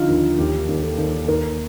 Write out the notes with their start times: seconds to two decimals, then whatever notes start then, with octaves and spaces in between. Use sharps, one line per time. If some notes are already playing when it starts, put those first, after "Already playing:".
Already playing: D3 F3 D#4 F4
0.08 D#2
0.38 D#2 G4
0.69 D#2
0.83 A4
0.98 D#2
1.28 D#2 A#4